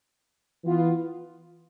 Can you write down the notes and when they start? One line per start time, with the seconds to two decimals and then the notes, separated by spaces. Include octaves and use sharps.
0.64 E3 B3 F4